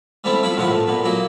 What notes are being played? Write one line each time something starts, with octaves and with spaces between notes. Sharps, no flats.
G3 A3 B3 C4 E4
F3 E4 F5 B5
A#1 E2 A2 C3 F3 F#5
A3
A#2 B3
F#3 A#3 E4